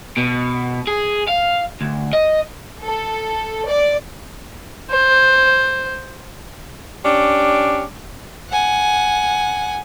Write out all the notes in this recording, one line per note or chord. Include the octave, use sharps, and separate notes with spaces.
B2
G#4
F5
D2
D#5
A4
D5
C5
C#4 D4 G4
F#5 G#5